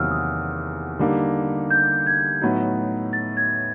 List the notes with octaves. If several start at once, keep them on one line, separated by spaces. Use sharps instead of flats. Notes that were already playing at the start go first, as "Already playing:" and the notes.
Already playing: E2 C3 D#3 F#3 A#3 E6 F6
D#6
D3 G3 A#3 D#4
G6
G#6
A2 F#3 B3 D#4
A6
G#6